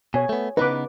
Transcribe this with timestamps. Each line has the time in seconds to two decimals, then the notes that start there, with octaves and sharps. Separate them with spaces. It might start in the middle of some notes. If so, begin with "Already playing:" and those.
0.14 B2 C#5 G#5
0.29 A3 B3
0.57 C#3 B3 D#4 B4 D6